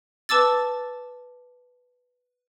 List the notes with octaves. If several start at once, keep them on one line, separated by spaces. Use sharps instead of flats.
B4 A5 D6 E6 A6